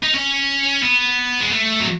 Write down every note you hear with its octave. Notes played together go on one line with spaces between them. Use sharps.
D#4
C#4
B3
G#3
A3
F#3